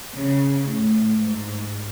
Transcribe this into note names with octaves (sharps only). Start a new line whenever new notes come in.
C#3
A2
G#2